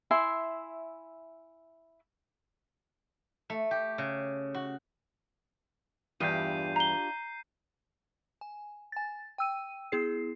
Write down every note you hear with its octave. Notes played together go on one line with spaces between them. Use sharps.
E4 E5 G#5 C6
A3
G4
C#3
F#4
E2 G2 D4 F4 G4 G6 C7 D#7
A#5 C7 G7
G#5
G#5 A6
G5 E6 D#7
B3 E4 G#4 C7